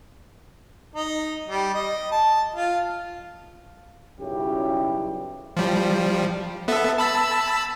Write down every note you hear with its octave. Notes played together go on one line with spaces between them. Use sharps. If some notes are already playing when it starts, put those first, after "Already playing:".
D#4
G3
D#5
A5
F4
B1 F#2 C#3 G3 E4 G4
F3 G3
B3 A4 E5
A5 B5 E6